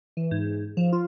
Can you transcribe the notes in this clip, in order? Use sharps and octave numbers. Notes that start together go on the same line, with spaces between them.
E3
G#2
F3
F4